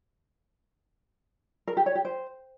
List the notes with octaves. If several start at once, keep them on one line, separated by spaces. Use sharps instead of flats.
A#4
G4
C#5
G4
C5